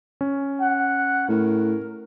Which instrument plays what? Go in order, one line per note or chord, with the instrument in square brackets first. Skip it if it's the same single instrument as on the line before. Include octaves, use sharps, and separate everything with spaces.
[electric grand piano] C#4
[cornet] F#5
[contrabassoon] A2 [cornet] A#4